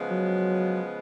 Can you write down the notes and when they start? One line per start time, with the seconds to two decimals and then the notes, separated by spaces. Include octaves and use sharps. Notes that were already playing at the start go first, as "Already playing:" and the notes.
Already playing: C#3 F3 G#3 B3
0.11 F#3